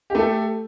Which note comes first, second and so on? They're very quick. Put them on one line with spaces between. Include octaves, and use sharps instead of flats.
G4 A3 A4